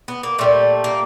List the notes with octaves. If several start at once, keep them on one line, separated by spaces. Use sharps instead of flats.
B3
A#3
A#2 G3 A3
A#3